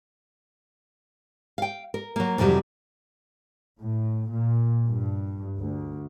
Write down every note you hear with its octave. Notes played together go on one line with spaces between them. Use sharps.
F5 G5
A#4
F#3 A#3
F2 C3 D#3 F#3 G3
A2
A#2
G2
D2